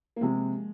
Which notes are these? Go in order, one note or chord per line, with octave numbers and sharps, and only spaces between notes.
A#3
C3 F3 G#3